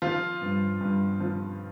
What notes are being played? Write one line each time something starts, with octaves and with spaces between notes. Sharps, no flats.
F3 F4
G2
G2
F3